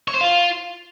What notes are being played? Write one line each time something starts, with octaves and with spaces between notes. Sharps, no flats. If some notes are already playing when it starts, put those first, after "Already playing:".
C#5
C5
F4